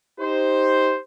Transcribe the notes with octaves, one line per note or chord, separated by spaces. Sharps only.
D#4 G4 C5